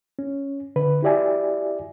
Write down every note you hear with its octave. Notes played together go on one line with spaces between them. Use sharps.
C#4
D3 B4
E4 F#4 G4 D5 E5 G#5